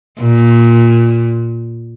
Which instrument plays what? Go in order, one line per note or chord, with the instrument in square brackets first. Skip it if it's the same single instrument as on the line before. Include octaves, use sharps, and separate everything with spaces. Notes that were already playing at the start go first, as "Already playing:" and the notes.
[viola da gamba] A#2